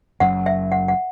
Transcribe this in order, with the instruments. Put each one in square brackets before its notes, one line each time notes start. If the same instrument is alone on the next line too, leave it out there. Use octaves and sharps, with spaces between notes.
[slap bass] F#1 F#2 F#3 [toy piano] F#5
[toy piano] E5
F#5
F#5